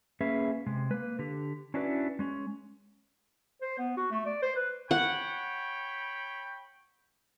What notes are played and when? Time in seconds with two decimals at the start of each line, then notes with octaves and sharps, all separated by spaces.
0.21 A#3 C#4 G#4 B4 E5
0.66 C3 G#3
0.91 A#3 B4
1.19 D3 G4
1.74 C#4 D4 E4 F#4 B4 D5
2.19 G#3 C#4 C#5
3.62 C5
3.79 B3
3.97 F#4
4.12 A3
4.26 D5
4.43 C5
4.56 B4
4.91 C#5 F#5 G5 B5